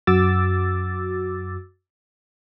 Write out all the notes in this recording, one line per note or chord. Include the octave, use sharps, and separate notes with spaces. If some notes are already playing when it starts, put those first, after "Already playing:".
F#2 F#4 D6 E6 A6